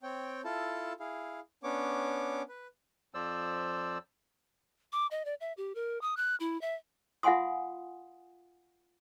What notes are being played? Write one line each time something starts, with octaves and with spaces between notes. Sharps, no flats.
C4 C#5 G5
E4 F4 A4 A5
E4 G#4 F5
B3 C#4 D4 C#5 D6
B4
F2 F3 C5 D5 E6
D6
D#5
D5
E5
G4
A#4
D#6
F#6
E4
E5
F4 F5 F#5 G#5 C6 D#6